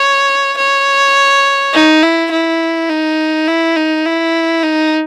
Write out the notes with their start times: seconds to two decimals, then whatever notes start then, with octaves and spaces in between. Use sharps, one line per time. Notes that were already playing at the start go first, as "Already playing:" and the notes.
Already playing: C#5
0.57 C#5
1.73 D#4
2.03 E4
2.31 E4
2.89 D#4
3.48 E4
3.76 D#4
4.05 E4
4.63 D#4